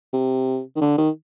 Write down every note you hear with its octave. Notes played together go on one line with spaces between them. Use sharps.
C3
D#3
D3
D#3